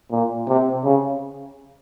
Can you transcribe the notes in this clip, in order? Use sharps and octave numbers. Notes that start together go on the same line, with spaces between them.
A#2
C3
C#3